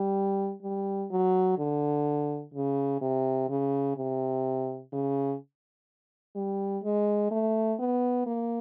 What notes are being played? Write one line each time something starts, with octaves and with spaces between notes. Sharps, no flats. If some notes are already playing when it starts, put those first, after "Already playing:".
Already playing: G3
G3
F#3
D3
C#3
C3
C#3
C3
C#3
G3
G#3
A3
B3
A#3